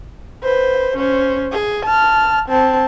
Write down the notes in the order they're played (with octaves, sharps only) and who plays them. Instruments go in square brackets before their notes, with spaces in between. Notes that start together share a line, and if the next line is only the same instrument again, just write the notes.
[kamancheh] B4 C5
C#4 C5
G#4
A5 F6
C4 A5